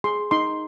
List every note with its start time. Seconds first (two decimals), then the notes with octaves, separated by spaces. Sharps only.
0.04 G#4 C6
0.31 D#4 C6